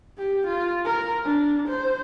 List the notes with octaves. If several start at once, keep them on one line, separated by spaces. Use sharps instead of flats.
G4
F4
A#4
D4
C5